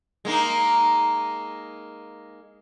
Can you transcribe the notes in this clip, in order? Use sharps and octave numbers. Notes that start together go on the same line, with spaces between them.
G#3 A#3 D#4